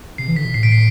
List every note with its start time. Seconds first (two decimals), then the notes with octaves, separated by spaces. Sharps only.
0.18 C3 C7
0.28 E3
0.36 D3 B6
0.45 B2
0.54 A2 C7
0.63 B6 D7
0.72 C7